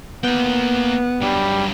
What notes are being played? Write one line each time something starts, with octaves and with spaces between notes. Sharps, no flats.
A#3 B3 G5
G2 F#3 G3